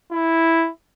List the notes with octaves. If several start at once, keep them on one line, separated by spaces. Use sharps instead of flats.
E4